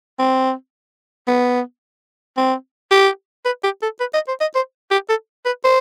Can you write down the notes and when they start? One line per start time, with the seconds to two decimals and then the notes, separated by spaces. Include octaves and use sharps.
0.19 C4
1.28 B3
2.37 C4
2.91 G4
3.45 B4
3.64 G4
3.82 A4
4.00 B4
4.14 D#5
4.28 C5
4.41 D#5
4.55 C5
4.91 G4
5.09 A4
5.46 B4
5.64 C5